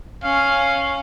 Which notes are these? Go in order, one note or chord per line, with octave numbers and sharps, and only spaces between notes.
C#4 F5